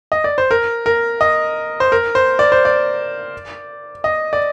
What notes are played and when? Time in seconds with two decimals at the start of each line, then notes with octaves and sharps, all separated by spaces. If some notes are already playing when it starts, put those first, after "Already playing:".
0.12 D#5
0.24 D5
0.38 C5
0.51 A#4
0.86 A#4
1.21 D#5
1.80 C5
1.92 A#4
2.15 C5
2.39 D5
2.52 C5
2.65 D5
4.04 D#5
4.33 D5